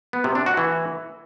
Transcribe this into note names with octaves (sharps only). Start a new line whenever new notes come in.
B3
C3
D4
F#4
E3